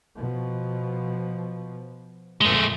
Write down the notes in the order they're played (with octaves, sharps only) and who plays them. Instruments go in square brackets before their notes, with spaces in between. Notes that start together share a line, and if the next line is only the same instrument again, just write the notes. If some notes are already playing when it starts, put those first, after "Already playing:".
[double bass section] B2 F3
[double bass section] F2 A#2 D3 [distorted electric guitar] G#3 A3